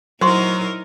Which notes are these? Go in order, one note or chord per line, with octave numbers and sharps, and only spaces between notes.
F#3 D#4 E4 A#4 C5 C6 C#6